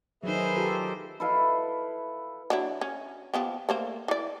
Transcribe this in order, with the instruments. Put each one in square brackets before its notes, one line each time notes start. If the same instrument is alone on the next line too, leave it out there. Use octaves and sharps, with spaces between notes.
[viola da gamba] D#3 C5 [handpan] F#3 D#4 [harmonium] G#4 B4 E5
[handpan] F4 G4 A4
[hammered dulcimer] E4 A4 B4 F5
[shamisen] F#3 D4 E4
C#4
F3 B3 G4
A3 A#3 C5
E3 D5